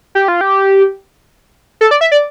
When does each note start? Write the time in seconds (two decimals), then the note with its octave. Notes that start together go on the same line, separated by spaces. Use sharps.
0.15 G4
0.28 F4
0.41 G4
1.81 A4
1.91 D5
2.01 E5
2.12 D5